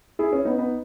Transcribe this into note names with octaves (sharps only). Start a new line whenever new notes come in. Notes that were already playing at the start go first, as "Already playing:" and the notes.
E4 G#4
C#4 E4
B3 D#4
B3 D#4